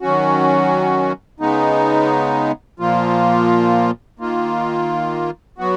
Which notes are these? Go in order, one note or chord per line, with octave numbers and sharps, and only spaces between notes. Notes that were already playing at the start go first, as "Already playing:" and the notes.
D#3 F#3 C#4 F#4
C#3 G#3 B3 D#4
A#2 F3 A#3 F4
D#3 A#3 F4
F#3 B3 F#4